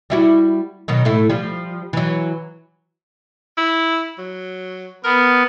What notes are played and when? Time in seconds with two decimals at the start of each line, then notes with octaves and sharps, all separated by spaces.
0.10 G3 E4 F#4
0.88 B2 D#3 F#3
1.05 A2 A3 E4
1.29 F3 G3
1.93 E3 F#3
3.58 E4
4.18 F#3
5.04 B3 A#4